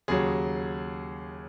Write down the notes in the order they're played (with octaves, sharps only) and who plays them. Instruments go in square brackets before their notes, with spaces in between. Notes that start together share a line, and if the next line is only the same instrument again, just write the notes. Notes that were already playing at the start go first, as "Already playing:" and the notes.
[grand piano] D#2 C#3 F#3 G#4